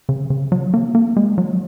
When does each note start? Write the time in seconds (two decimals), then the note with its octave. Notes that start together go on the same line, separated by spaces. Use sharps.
0.09 C#3
0.30 C#3
0.52 F#3
0.74 A#3
0.95 A#3
1.17 G#3
1.38 F#3